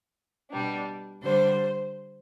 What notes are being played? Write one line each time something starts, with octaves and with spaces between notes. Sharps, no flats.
B2 G3 D4
D3 G3 D4 C5